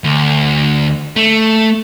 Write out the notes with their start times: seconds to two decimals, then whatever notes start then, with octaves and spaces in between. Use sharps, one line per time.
0.04 D2
1.16 A3